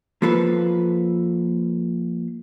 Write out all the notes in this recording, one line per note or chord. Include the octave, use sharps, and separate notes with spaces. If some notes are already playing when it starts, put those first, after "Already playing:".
F3 A#3 F4 A4 B4